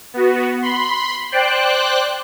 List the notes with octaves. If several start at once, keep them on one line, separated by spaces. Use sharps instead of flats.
B3 F#4
B5 C6
C5 D5 G5 F#6